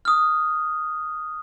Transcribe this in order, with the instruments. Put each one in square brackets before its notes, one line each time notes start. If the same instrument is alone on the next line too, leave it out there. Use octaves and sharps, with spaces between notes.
[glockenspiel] D#6 F6